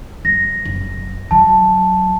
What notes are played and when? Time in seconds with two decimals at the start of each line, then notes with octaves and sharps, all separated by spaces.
0.25 F#1 G3 A#6
0.65 F#1
1.31 D3 F#3 A5